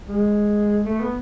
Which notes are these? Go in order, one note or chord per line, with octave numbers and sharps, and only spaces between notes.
G#3
A3
B3